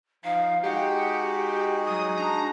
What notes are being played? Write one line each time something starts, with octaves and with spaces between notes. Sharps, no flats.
F3 D#4 F5
G#3 D#4 F#4 G4 F#5
F#3 D#6
D4 A#5